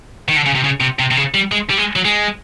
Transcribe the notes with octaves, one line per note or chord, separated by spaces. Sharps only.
D#3
D3
C#3
C3
C#3
C3
C3
C3
C#3
G3
G#3
G3
G#3
F#3
G#3